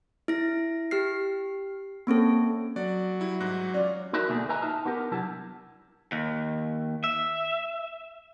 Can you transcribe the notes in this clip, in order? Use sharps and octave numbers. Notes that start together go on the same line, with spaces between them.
E4 A#6
G4 F6 C7
A#3 C4 C#4 A4
F#3 D5
G3 E4
G#2 F#6 A#6
C#4 F4 D5
D#4 E4 F#4 A#4 E5
D2 B2 A3 A#3 D4 G#4
B4 D#5 E5 G#5 A#5
D#4 F4 A5
B3 D4 G4 A#4
C3 F#3 G3 E4 A5
D#2
E5